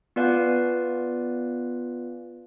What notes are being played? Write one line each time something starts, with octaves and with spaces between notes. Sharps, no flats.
B3 F4 B4 D5 F5 G#5